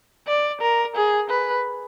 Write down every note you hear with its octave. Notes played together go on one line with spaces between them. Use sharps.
D5
A#4
G#4
B4